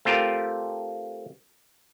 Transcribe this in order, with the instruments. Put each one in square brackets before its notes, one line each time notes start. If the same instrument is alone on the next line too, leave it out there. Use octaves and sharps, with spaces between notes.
[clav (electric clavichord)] A3 C4 F4 G4 A#4